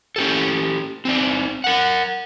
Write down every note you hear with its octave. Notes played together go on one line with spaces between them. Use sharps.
C#4 G4 A4
C4 D#4 D5
A#4 F#5